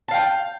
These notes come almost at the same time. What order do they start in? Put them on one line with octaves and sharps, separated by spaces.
A5 F5 G5